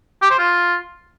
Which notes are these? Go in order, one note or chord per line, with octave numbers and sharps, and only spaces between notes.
G4
C5
F4